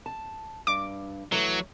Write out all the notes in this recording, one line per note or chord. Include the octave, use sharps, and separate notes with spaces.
A5
G2 D6
E3 F#3 A3